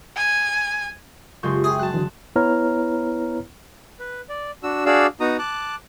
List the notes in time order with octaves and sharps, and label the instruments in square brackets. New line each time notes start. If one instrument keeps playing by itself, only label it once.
[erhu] G#5
[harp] F#1 G#3 C6 [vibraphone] F4 G4 [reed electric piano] C#6 G6
[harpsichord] G#4 [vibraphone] E5 G5
[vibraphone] F#3 F#4 [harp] A5 F#6
[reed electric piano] D3 E3
[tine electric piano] B3 E4 B4 C#5 A#5 F6
[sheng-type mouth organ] B4
D5
D4 F#4 E6
D4 F#4 G#4 D5 F5 E6
B3 D#4 F#4 A#5 D#6
A5 D6 F#6